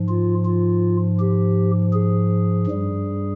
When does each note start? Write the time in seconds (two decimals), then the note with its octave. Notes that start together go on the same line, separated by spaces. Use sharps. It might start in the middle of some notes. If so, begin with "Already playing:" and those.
Already playing: G#2 F3
0.09 F4
0.45 F4
1.19 G4
1.93 G#4
2.67 G2 G3